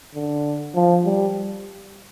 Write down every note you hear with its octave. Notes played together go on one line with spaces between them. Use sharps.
D3
F3
G3